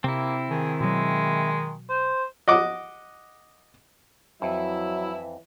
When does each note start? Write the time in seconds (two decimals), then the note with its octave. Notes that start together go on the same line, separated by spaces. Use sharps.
0.04 C3 A#3 C4 E4
0.50 D#3 G#4
0.80 B2 F#3 G#3
1.89 C5
2.48 D#5 F#5 D6
4.42 F2 E3 F#3 E4 E5